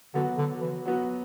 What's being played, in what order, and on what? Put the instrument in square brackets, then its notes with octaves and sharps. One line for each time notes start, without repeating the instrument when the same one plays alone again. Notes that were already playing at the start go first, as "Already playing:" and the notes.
[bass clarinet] D3 [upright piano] F#3 B3 F#4
[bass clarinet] D3
E3
[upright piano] F#3 B3 F#4